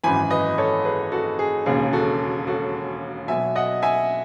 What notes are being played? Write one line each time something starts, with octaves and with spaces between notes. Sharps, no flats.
G#1 F#2 E3 G#5 B5
B4 D#5
A4 C#5
G#4 B4
F#4 A4
G#4
E1 D#2 C#3 G#4
F#4 A4
F#4 A4
B1 B2 F#3 E5 G#5
D#5 F#5
E5 G#5